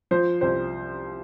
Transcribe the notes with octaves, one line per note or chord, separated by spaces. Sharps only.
F3 C5
C2 C5